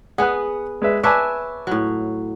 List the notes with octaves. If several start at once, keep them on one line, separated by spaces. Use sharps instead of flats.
B3 G#4 F#5 F#6
G#3 B4 E5
B4 C#5 E5 G#5 A5 D6
A2 F#3